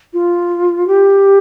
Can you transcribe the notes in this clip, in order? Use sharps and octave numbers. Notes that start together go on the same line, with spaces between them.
F4
G4